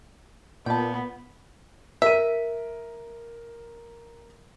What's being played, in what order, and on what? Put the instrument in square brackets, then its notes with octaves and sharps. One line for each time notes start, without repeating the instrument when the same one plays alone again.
[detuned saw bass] A#2 [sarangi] B3 [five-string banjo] G5 A5
[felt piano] A#4 D#7 [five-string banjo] E5